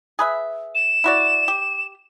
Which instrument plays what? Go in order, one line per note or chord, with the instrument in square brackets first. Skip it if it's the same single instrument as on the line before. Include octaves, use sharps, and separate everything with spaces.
[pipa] G#4 B4 E5
[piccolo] E7
[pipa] E4 F#4 D5
G4